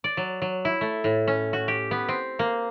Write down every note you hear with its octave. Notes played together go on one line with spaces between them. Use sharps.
D5
F#3
F#3
E4
A3
A2
C#4
F#4
G4
B3
C4
A#3